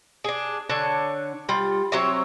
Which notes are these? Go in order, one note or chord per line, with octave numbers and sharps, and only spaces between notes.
D4 G#4
D3 D4 C#5 A5
G3 F4
F#3 C4 C#5 E5